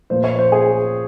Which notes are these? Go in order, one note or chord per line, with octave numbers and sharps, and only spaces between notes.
A#2 F3 A#3 C5
C#5
C5
G#4